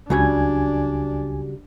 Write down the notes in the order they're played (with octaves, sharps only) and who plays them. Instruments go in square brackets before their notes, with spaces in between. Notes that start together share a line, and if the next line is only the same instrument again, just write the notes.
[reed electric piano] C#2 G#5 G#6 [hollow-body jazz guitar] C#3 F#3 G3 [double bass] D4